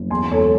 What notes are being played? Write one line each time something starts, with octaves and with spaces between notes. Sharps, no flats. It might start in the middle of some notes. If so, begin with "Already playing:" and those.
Already playing: F#1
E2 G#5 C6
E1 A4 C#5